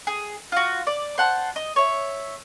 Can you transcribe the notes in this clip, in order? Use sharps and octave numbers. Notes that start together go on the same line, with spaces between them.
G#4
F4 F#4
D5
C5 F#5 A5
D#5
C#5 E5